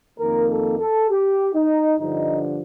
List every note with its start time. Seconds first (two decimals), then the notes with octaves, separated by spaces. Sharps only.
0.19 F2 D#3 A#3 A#4
0.49 A4
0.79 A4
1.10 G4
1.55 D#4
1.99 G2 D3 F3 D#4